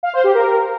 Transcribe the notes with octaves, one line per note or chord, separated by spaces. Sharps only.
F5
C5
G4
A#4